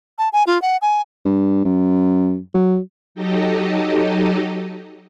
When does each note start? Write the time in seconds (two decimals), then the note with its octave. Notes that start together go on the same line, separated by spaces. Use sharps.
0.19 A5
0.33 G#5
0.47 F4
0.62 F#5
0.82 G#5
1.25 G2
1.64 F#2
2.54 F#3
3.15 F#3 D#4 G4 A4 D#5